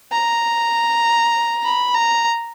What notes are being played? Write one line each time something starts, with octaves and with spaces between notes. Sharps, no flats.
A#5
B5
A#5